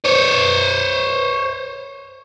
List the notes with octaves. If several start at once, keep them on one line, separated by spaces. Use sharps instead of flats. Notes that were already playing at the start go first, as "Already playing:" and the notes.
C5 C#5